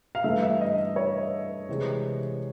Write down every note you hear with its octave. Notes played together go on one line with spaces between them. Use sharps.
F5
G2 E3 A3 E5
E5
D#5
C#5
C3 E3 G#3